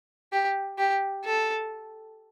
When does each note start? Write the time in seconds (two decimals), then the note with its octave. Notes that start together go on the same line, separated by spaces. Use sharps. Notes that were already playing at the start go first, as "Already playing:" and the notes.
0.33 G4
0.78 G4
1.25 A4